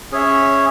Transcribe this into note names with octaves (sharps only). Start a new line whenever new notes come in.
C#4 G#4 C#5 E5